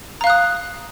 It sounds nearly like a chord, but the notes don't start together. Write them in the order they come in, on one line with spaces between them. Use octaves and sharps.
A#5 F5 F#6 D#6